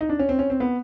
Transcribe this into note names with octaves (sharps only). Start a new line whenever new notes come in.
D#4
D4
C#4
C4
C#4
C4
B3